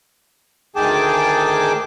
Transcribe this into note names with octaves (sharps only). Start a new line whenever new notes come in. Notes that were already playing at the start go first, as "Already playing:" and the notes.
D2 D#3 G#4 G5 A5 D6